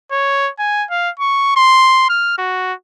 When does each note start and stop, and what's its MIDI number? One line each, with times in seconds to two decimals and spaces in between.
0.11 0.50 73
0.59 0.85 80
0.91 1.10 77
1.20 1.52 85
1.56 2.05 84
2.09 2.33 89
2.38 2.73 66